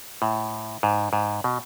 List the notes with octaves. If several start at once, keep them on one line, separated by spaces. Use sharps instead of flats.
A2
G#2
G#2
B2